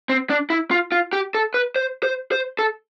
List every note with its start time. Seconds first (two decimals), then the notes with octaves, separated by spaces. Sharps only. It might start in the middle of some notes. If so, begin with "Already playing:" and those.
0.09 C4
0.30 D4
0.50 E4
0.71 F4
0.92 F4
1.13 G4
1.35 A4
1.54 B4
1.76 C5
2.03 C5
2.32 C5
2.59 A4